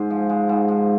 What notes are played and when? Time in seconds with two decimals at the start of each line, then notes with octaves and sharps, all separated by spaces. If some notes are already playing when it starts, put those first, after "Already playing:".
Already playing: G#2 G#3 C5
0.10 F3
0.29 G#3
0.49 G#2
0.68 F3